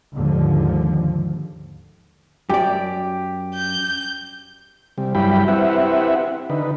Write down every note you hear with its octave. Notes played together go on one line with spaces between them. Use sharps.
D#2 G#2 D3 F3
F#2 G4 D5
G6
C3 G3
G2 F#3 G3 E4 G5 B5
C4 E4 G4 B4 E5 F#5
D3 D#4 B4